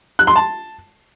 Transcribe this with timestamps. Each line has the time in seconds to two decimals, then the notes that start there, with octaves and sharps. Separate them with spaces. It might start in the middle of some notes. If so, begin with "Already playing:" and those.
0.19 F#6
0.27 C6
0.36 A5